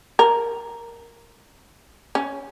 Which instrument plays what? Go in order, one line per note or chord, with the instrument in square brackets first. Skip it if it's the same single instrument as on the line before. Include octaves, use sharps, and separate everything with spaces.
[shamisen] A#4
C#4